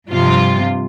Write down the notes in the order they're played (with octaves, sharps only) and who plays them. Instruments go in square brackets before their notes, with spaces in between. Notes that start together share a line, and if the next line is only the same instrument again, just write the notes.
[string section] G2 C3 F3 F4